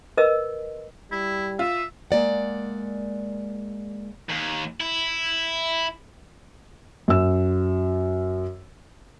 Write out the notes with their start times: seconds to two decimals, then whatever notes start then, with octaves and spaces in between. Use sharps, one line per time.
0.17 A#4 B4 D#5 E6
1.12 G3 E4
1.59 F4 E5
2.11 G#3 A#3 D5 F#5
4.30 D#2
4.80 E4
7.08 F#2 E6